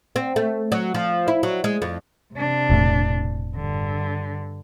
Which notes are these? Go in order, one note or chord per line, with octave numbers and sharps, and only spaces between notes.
C4
A3
F#3
F3
E4
F#3
G#3
F2
C3 D4
E1 A2
G2 D3